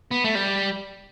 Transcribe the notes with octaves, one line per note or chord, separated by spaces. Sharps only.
B3
A3
G3